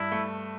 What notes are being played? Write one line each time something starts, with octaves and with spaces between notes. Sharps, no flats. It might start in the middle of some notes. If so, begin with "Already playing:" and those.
Already playing: G2 E4
A3